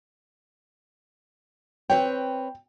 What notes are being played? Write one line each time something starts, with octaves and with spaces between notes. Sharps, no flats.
C4 B4 C#5 G5